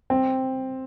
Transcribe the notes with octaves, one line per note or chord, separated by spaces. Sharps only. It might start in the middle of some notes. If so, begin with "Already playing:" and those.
C4